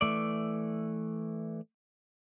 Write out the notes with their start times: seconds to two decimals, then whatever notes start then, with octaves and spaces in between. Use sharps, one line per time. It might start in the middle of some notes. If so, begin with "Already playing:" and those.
0.01 E3 A3 D5